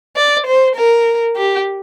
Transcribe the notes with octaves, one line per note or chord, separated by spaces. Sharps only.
D5
C5
A#4
G4